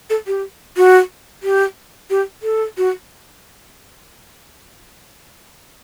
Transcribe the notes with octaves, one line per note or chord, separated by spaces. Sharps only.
A4
G4
F#4
G4
G4
A4
F#4